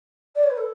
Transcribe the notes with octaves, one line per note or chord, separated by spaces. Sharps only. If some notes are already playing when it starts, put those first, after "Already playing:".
D5
C#5
B4
A4